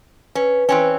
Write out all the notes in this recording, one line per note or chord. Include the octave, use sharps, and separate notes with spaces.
C#4 B4
E3 C4 C#4